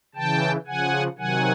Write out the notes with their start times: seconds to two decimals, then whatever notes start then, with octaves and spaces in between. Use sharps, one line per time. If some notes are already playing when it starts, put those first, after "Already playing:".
0.15 C#3 E3 G5 A5
0.67 C#3 F3 F#5 G#5
1.18 C3 D#3 F#3 F#5 G#5